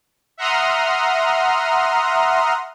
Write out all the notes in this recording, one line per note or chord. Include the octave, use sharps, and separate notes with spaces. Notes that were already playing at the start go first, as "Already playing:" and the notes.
E5 F#5 A#5 C6 D#6 F6